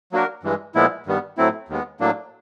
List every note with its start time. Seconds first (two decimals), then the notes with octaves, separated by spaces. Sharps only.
0.12 F#3 A#3 D4 F#4 A#4
0.43 G2 E3 G#3
0.75 A#2 F3 G#3 B3 E4
1.06 G2 D#3 G3 B3
1.37 A2 F#3 A3 C4 E4
1.68 D#2 D#3 G#3 B3
2.00 A2 F#3 A#3 D4